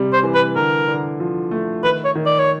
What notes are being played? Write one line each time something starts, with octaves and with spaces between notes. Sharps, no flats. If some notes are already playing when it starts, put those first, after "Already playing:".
Already playing: C3 G3
C5
E3
B4
D3 A#4
D3
F3
A3
D#3 B4
C#5
D#3
D5
C#5